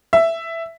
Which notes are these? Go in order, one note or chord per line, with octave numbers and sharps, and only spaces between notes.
E5